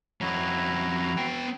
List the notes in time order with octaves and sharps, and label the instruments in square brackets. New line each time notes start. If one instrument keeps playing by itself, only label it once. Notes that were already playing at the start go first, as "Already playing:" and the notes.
[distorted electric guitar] F2 C#4 [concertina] E4 F#4 A#5
[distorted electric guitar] B3 G5